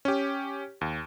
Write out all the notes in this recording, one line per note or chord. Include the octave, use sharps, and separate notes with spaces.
C#4 G4
D#2